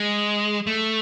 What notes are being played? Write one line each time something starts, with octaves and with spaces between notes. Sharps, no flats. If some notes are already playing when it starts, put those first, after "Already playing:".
Already playing: G#3
A3